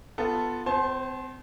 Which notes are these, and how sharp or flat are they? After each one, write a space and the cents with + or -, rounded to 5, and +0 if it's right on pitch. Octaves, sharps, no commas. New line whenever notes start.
B3 +0 F4 +0 A4 +5
C4 -35 C5 +20 A5 -40